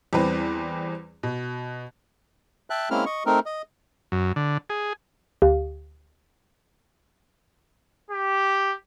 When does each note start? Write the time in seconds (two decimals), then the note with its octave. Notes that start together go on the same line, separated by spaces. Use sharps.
0.13 E2 G3 C4 B4
1.23 B2
2.70 E5 G5 A5 F#6
2.90 G#3 A#3 C4 C#4 E4 F6
3.06 D#5 C#6
3.26 A3 C4 D#4 A#4
3.46 D#5
4.12 F#2
4.36 D3
4.70 G#4
5.42 D2 G4 F5
8.11 G4